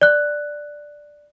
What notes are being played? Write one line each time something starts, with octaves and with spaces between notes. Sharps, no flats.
D5 F#6